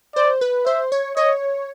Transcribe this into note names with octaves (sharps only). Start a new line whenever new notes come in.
C5 D5
B4
C5 E5
C#5
C#5 D#5